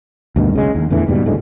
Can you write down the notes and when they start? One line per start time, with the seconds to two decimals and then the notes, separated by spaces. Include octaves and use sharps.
0.36 D2 G2 B2 D#3
0.53 B1 C#3 G#3
0.75 D#2
0.90 E2 A2 D3 E3
1.07 D#2 G#2 B2 G3
1.26 F#1 D2 A2 G#3